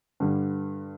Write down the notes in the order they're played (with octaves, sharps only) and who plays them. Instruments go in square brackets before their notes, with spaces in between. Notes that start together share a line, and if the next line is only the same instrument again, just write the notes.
[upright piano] G2 D3 G3